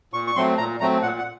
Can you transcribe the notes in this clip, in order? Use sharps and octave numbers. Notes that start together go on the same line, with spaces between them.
A#2 C#6
C#6
F#3 A3 C4 C6
A#2 A#5
F#3 A3 C4 A#5
A#2 F#5
F#5